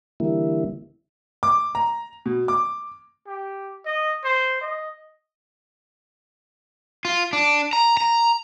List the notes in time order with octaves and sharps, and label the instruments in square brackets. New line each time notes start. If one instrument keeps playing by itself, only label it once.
[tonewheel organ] D3 E3 G3 A#3 E4
[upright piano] D6
A#5
B2
D6
[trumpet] G4
D#5
C5
D#5
[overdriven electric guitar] F4
D4
A#5
A#5